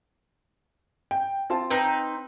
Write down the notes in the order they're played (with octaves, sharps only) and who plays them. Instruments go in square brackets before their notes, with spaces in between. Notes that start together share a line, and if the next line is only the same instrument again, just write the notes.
[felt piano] G5
C4 F4 A5
[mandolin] C4 D#4 [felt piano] B4